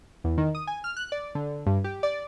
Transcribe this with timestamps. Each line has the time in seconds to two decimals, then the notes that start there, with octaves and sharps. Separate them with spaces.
0.24 E2
0.38 D#3
0.55 D#6
0.67 G#5
0.84 F6
0.97 F#6
1.12 D5
1.35 D3
1.66 G2
1.84 G4
2.03 D5